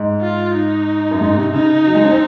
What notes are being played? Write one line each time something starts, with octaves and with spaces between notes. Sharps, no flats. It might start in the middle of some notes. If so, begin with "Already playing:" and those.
Already playing: G#2
F4
D#4
F#2
G#2
C3
C#3 D#4
F#3
G#3
C#4
C4